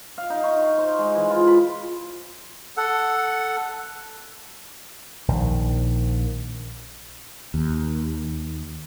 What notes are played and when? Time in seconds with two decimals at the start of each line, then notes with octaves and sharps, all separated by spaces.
0.18 F5
0.30 D#4
0.44 C#6
0.62 A#5
0.78 C5
0.98 G#3
1.15 E3
1.30 F4
1.47 B5
2.77 A4 F#5
5.28 A#1 D#3
7.54 D#2